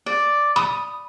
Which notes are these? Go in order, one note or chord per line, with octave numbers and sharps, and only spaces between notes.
D5
B5 D#6